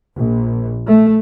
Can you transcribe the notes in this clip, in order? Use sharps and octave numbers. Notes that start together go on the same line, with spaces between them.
A#1
A3